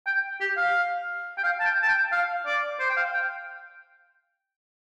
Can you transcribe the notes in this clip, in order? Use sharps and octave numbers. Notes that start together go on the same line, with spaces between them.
G5
G4
F5
G5
F5
A5
G5
A5
G5
F5
D5
C5
G5
F5
G5